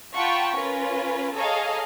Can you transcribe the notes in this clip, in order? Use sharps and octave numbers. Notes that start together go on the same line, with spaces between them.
F4 F#5 G5 A5 B5 C#6
C#4 F4 A#4 B4
G#4 A4 C#5 D#5 F5 A#5